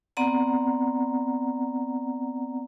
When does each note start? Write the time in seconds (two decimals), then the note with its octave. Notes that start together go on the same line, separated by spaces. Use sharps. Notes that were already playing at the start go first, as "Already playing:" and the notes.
0.17 B3 C4 D5 F#5 A#5